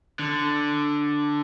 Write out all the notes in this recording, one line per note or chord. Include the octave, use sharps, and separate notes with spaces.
D3